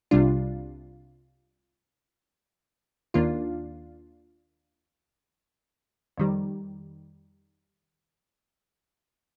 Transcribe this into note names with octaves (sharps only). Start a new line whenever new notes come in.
C2 C3 G3 D4 F4
D#2 D#3 A#3 D4 F4
F2 D#3 G3